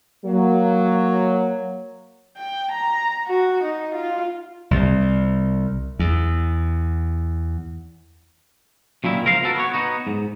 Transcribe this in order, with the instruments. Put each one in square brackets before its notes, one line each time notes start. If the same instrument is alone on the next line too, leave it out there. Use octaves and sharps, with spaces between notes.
[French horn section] F#3 A#3
[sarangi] G5
A#5
F#4
D#4
F4
[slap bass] C2
E2
[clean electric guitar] F#2 A#2 D#3 E4
C#2 F3 A#4 C5 F5
B3 F#4 A4 A#4
B3 F#4 C#5
B3 D#4 F#4
G#2